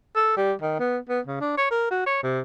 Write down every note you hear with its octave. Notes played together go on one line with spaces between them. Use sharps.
A4
G3
D#3
B3
B3
C#3
D4
C#5
A#4
F#4
C#5
C3